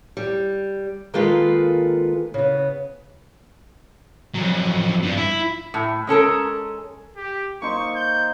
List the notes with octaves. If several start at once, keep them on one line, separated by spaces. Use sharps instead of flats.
G3
D#3 G#3 A#3 F4 A4 B4
C#3 B3
F2 F#3
G2 D4
E4
A2
G#3 C#4 A4 A#4
G4
A#3 D#4 C5 C#6
G6